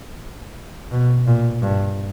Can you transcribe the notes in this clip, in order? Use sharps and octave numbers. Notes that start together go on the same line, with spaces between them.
B2
A#2
G2